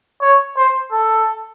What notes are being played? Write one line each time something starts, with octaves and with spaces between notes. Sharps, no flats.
C#5
C5
A4